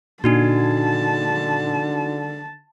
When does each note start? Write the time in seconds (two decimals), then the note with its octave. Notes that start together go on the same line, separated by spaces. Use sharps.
0.24 A#2 D3 D4 D#4 F#4 A5